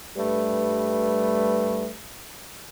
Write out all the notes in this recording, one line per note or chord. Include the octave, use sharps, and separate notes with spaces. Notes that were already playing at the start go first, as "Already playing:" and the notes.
G2 G3 A3 B4